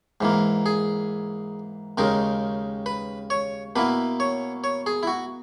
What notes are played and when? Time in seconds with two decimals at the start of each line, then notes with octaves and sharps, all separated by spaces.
0.21 G#2 E3 A#3
0.66 G#4
1.98 D#2 C#3 G#3 D#4 A#4
2.86 B4
3.30 C#5
3.76 B2 A#3 E4 B4
4.20 C#5
4.64 C#5
4.86 G#4
5.03 E4
5.07 F#4